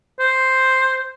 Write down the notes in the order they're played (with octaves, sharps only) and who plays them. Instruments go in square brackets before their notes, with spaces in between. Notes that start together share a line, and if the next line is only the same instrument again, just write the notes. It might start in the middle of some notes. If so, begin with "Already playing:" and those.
[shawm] C5